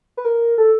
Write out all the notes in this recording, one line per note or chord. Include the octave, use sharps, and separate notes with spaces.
B4
A#4
A4